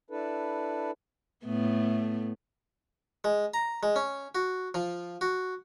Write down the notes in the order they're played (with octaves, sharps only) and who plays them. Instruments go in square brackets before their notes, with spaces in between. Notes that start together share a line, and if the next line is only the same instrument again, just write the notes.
[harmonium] D4 E4 A4 B4
[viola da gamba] A2 A3 B3
[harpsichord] G#3
A#5
G#3
C#4
F#4
F3
F#4